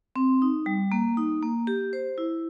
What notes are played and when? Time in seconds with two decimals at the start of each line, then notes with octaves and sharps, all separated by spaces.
0.16 C4
0.42 D#4
0.66 G3
0.92 A#3
1.17 D#4
1.42 A#3
1.67 G4
1.93 C5
2.18 E4